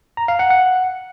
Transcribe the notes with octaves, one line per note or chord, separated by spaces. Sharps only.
A#5
F5
F#5
F#5